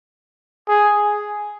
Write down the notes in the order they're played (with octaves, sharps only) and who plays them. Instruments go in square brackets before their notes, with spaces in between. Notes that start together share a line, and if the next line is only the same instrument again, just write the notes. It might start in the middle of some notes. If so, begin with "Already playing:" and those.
[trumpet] G#4